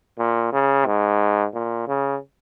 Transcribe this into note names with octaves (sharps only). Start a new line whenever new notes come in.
A#2
C#3
G#2
A#2
C#3